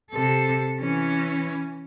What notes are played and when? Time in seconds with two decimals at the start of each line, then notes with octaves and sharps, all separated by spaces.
0.11 C3 A4
0.80 E3 C#4